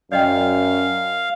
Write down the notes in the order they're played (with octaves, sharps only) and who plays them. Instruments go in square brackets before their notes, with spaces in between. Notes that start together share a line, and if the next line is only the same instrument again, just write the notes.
[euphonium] F#2 [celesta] D5 D#5 G5 [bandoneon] F5